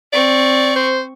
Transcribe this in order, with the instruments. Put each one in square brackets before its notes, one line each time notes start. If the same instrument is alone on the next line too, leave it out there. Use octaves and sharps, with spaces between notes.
[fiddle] C4 C#6 [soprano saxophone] D5
[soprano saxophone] C5